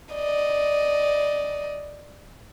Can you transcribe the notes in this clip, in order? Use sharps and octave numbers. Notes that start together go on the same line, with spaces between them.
D5 D#5